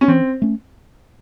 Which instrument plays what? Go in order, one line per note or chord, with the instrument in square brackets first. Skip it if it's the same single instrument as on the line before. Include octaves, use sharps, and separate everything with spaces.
[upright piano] C#4
[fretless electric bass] E3 [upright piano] C4
[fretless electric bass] A3 C#4